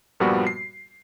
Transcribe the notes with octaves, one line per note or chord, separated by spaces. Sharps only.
G2 A#2 F3 G3 B3 F#4
C7